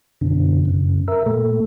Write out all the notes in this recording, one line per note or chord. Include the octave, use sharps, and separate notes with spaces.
F#2 B2 D3
F#2 C#3
A#4 E5
A#2 A3